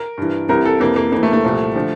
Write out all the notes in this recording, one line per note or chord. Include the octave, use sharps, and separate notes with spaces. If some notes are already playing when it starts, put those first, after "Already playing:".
Already playing: A#4
G2 E3
C2 C3 E3 A#4
A4
F2 C3 E3 A#3
A#3
F2 E3 A#3
A3
A3
C2 A#2 F3
D3 F3